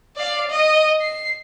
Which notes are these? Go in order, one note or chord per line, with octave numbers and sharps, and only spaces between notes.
D5 F5
D#5
C7